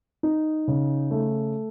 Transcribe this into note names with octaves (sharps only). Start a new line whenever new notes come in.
D#4
C#3
A3